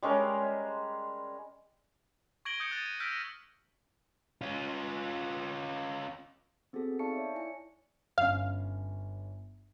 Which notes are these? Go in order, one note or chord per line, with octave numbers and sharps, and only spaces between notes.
G3 G#3 C#4 A#4
C#6 G#6 A#6 D7 F#7 G7
D#6 G6 C#7 D7
F#6 G#6 A6 D#7
D#7
E6 F6 G6 A#6 B6 D7
C#4 F4
B3 C4 F#4 G#4 A4
D#4 D5 F5 A5 C#6 C#7
C#5 D5 E5
E4 G#5 C#7
G1 C#4 F5